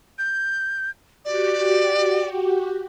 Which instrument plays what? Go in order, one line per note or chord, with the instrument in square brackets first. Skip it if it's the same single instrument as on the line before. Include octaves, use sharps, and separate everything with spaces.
[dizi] G6
[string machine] F#4 G4 [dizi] D5